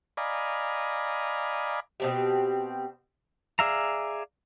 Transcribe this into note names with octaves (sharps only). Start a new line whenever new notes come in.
D5 D#5 F5 G#5 A#5 B5
B2 C4 G4
G#4 D5 E5 F5 A#5